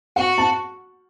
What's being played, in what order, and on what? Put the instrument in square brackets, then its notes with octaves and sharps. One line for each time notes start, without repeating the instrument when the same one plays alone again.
[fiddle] F#4 [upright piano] F#5
[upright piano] A5